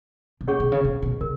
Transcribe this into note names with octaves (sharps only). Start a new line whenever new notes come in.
B2
A#2 C#4 G#4 C#5 F#5 C#6
B2
C#3
B2
B2
C#3 A#4